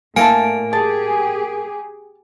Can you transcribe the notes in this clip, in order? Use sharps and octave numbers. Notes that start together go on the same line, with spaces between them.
A2 D3 A#3 E4 G#5 A5 D7
G4 G#4 A5